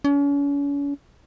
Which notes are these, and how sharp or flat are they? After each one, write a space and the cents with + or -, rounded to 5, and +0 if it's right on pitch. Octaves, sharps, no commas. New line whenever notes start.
C#4 +40